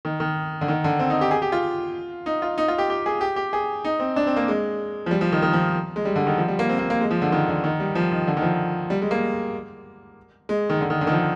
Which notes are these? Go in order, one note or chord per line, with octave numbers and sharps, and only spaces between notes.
D#3
D#3
D3
D#3
D3
C4
D#4
G4
G#4
G4
F4
D#4
F4
D#4
F4
G4
G4
G#4
G4
G4
G#4
D#4
C4
D4
C4
A#3
G#3
F3
G3
F3
D#3
D#3
F3
G#3
G3
D3
D#3
F3
G3
A#3
C4
A#3
A#3
G#3
F3
D3
D#3
D3
D#3
G3
F3
D#3
D3
D#3
F3
G3
G#3
A#3
G#3
D#3
D3
D#3
D3
D#3
F3